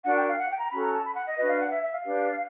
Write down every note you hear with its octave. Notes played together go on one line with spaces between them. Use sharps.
D4 F#4 A#4 F#5
G5
F5
F#5
G5
A#5
C#4 F#4 A4 B5
A#5
A5
B5
F#5
D#5
D4 F#4 B4 D#5
F5
F#5
E5
E5
F5
D4 G4 B4